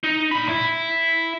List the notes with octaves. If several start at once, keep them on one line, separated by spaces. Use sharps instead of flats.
D#4
A#2 B5
E4